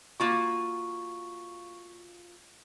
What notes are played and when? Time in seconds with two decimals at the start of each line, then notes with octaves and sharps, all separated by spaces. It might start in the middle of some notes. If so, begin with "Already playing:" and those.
0.20 A#3 F4 F#4 C#6